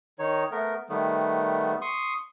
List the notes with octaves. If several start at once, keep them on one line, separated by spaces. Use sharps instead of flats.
D#3 D#4 C#5
A3 B3 A#4
D#3 G3 A3 B3
C6 C#6 D#6